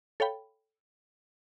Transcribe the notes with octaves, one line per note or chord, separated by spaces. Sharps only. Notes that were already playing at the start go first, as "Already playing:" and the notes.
A4 C#5 F5 G5 B5